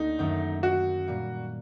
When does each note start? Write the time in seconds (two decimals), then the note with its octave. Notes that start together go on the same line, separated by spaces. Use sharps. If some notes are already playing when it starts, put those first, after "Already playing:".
Already playing: D2 A#3 D#4
0.19 F#2 D#3 F#3 A3
0.63 F#4
1.08 A#2 G3 A#3